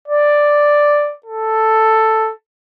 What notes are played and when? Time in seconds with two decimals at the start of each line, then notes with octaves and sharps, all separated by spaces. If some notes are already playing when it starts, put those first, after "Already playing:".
0.08 D5
1.26 A4